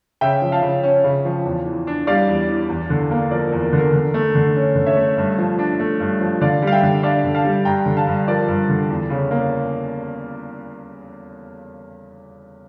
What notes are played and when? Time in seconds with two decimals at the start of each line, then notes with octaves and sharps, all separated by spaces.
0.21 C#3 E5 G5
0.42 F3
0.52 F5 A5
0.62 C#3
0.83 C#4
1.04 C#3
1.25 F3
1.45 E2
1.66 E3
1.87 D4
2.07 G3 D5 F5
2.28 E2
2.48 E3
2.69 E2
2.90 D3
3.11 A#3
3.31 F3 A#4 D5
3.47 A#4
3.52 E2
3.63 A#4
3.73 D3 A#4
3.93 D3
4.14 A3
4.35 D3
4.56 C#4
4.76 D3
4.86 C#5 E5
4.97 A3
5.17 G2
5.38 F3
5.59 D4
5.80 A3
6.00 G2
6.21 F3
6.41 D3 D5 F5
6.62 G3
6.67 F5
6.72 E5 G5
6.83 D3
7.03 D4 D5 F5
7.24 D3
7.35 F5 A5
7.45 G3
7.65 G2 G5 A#5
7.86 D3
7.97 F5 A5
8.07 G2
8.28 F3 A#4 D5
8.48 G2
8.69 D3
8.90 E2
9.10 C#3
9.31 A#3